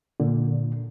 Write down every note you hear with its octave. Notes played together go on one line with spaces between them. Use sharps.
A#2 D3